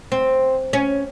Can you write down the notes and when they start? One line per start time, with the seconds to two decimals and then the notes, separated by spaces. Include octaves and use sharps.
0.12 C4
0.73 C#4